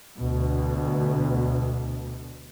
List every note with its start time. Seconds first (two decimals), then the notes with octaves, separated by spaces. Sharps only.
0.18 D2 B2